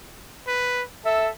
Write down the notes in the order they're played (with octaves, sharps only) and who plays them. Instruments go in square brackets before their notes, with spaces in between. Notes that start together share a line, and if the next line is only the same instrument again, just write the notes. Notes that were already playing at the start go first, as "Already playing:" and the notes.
[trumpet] B4
[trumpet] A4 [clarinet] E5